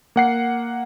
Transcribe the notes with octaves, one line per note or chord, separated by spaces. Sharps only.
A#3 F#5 C7